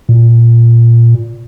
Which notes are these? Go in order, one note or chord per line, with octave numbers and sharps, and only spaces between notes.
A#2